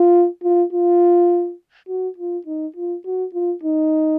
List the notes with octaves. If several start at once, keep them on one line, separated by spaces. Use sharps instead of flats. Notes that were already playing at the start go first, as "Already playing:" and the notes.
Already playing: F4
F4
F4
F#4
F4
D#4
F4
F#4
F4
D#4